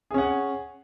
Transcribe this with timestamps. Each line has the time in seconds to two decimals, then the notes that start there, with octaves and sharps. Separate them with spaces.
0.11 G#4
0.14 C#4
0.18 F#5